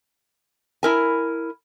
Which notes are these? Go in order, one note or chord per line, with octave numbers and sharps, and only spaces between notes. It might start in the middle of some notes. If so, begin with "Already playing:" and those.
E4 A#4 G#5